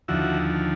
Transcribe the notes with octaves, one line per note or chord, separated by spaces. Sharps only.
D#2 D3 F3 E4 F#4